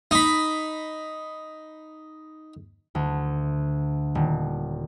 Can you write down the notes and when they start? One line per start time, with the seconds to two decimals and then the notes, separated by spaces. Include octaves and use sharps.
0.11 D#4 B5
2.95 D2
4.15 D#1